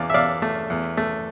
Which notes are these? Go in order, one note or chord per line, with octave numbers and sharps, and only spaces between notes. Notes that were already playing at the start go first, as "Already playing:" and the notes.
Already playing: E2 D5 F5
E5
E2 D5 F5
A3
E2
A3